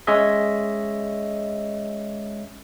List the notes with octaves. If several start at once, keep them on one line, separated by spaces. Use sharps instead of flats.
G#3 C#4 C#5 D#5 E5